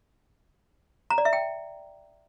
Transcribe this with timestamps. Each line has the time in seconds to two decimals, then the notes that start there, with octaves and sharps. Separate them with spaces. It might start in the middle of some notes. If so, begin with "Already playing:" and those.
1.10 A#5
1.18 D5
1.25 E5
1.33 G5